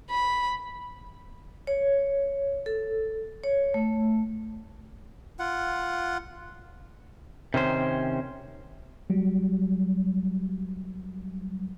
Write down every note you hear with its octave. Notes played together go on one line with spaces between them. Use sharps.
B5
C#5
A4
C#5
A3
F4 F#5
C3 D#3 C#4 C5
F#3 G3